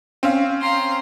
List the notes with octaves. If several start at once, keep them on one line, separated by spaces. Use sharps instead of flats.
C4 C#4 F5
A#5 C6